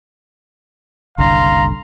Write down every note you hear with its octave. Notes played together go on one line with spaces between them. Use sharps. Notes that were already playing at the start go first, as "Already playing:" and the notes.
F#1 C2 D3 F5 A#5 C6